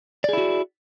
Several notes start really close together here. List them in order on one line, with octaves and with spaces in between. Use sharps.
D5 G#4 E4 F#4